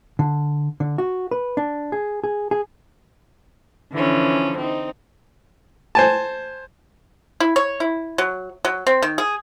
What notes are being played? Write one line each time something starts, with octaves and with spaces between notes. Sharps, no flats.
D3
D3
F#4
B4
D4
G#4
G#4
G#4
D3 E3 F3 C#4
C4 D#4
C5 G#5 A5
E4
C#5
E4
F#3
F#3
C4
D#3
G#4